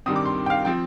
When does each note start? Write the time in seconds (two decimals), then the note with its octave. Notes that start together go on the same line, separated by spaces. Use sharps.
0.06 G2 D#3 G3 C4 D#6
0.16 D6
0.25 C6
0.46 G5
0.50 F5
0.65 F3 C4 G5